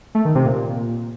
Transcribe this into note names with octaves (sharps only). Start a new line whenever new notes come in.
A3
D#3
C3
A#2